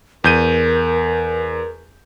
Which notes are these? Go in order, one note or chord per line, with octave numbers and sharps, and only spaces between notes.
E2 A#4 G6 D#7